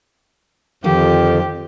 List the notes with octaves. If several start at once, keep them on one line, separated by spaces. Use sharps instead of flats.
F2 D3 D#3 F3 G4